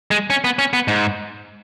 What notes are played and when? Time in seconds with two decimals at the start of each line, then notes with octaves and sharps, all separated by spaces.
0.11 G#3
0.30 C#4
0.44 B3
0.59 C#4
0.73 B3
0.88 G#2